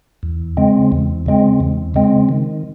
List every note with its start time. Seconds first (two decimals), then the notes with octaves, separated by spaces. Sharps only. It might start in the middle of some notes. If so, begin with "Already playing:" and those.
0.23 E2
0.57 C#3 G#3 C4
0.92 E2
1.26 C#3 G#3 C4
1.60 E2
1.94 C#3 G#3 C4
2.29 D#3